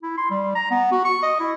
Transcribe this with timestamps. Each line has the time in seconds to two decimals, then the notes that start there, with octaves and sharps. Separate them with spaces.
0.03 E4
0.17 C6
0.30 G3
0.55 A#5
0.71 B3
0.92 F#4
1.05 C#6
1.23 D#5
1.40 E4